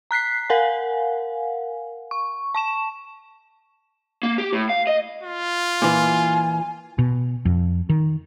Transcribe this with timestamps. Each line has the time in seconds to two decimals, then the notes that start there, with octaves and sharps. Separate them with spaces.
0.11 A#5 F#6 B6 C7
0.50 A#4 F5 F#5 G#5
2.11 C#6
2.55 A5 C#6 E7
4.23 A#3
4.38 G4
4.53 A2
4.69 F5
4.87 D#5
5.23 F4
5.82 A#2 E3 G#5
6.98 B2
7.45 F2
7.89 D#3